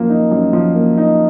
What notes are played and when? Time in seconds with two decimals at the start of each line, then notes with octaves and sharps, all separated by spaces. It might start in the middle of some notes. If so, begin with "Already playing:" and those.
Already playing: F#2 F3 A#3
0.10 D#4
0.31 F#2
0.53 F3
0.75 A#3
0.97 D#4